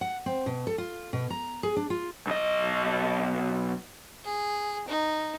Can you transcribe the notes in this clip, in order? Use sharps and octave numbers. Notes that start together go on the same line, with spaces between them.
F#5
C4
B2
A4
F4
B2
A#5
G#4
D4
F4
B1 D#5
G#4
D#4